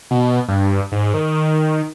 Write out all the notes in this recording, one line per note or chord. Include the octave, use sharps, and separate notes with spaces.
B2
G2
G#2
D#3